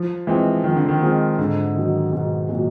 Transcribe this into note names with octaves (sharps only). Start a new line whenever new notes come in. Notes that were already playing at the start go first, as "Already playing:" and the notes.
Already playing: F3
E3 G#3 C4 F4
D#3 F3
D3
D#3
G#3 C4 F4
G#2 D3
D#3 F#3
G#2 B2
A#2 D#3 F#3